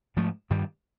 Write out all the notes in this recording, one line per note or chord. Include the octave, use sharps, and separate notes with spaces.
G#2 F3 A3
G2 D#3 G3